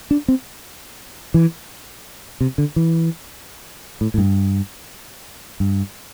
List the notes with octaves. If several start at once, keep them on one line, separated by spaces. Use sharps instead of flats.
D4
C4
E3
C3
D3
E3
A2
A2
G2
G2